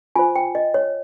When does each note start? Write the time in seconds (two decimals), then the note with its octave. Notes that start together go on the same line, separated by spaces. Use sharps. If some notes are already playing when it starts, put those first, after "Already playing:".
0.16 F4 C5 G#5
0.36 G5
0.55 D#5
0.74 C#5